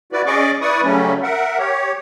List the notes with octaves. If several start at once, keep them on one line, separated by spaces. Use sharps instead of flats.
E4 F#4 B4 D5
C#4 G#4 D5 D#5 C#6 D6
E4 B4 D5 C#6 D#6
C#3 F#3 G3 A3 C#4
A#4 E5 F#5
G4 C#5